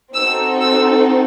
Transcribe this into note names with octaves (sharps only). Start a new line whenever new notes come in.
C4 D#4 F#4 A4 E6
E6